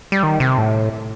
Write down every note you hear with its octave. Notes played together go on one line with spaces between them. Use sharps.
G3
D#3
C3
A2